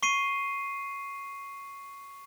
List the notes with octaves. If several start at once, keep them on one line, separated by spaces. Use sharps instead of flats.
C#6 C7 D#7